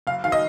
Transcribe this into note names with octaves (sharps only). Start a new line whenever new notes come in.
F#1 F5
D#3 F5
D#5